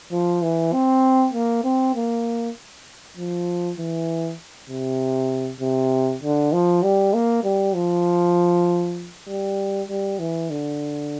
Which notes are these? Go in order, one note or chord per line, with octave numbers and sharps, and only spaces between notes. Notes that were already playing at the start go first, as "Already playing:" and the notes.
F3
E3
C4
A#3
C4
A#3
F3
E3
C3
C3
D3
F3
G3
A#3
G3
F3
G3
G3
E3
D3